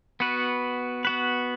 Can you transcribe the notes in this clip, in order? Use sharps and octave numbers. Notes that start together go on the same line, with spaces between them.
B3 F#4 B4
B3 F#4 B4